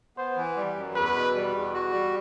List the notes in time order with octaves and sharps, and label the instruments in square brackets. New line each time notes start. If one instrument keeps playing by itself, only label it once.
[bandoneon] B3 [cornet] C5
[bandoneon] E3
G3
F#2
[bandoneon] E2 [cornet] B4
[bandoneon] B2
G3
E2
F#4
G3